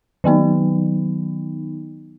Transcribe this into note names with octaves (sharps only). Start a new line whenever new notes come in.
D#3 F#3 B3 D#4